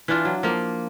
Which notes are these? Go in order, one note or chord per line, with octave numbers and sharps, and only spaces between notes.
E3 D4 F4
F#3
F3 A#3